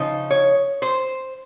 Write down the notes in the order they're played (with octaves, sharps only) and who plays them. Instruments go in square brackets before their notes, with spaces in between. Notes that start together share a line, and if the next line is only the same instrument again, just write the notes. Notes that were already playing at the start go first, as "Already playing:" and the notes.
Already playing: [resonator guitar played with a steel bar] C#3 F3 D#4
C#5
C5